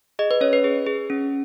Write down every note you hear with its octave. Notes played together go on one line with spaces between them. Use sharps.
G#4 D#5
B4
C#4 C#5
B4
G#4
G#4
C#4